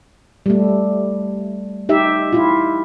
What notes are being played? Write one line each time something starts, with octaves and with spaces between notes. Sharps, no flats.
G3 A3
D#4 G4 E5
E4 F4